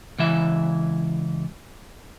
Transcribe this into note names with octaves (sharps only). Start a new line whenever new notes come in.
C#2 E3 E5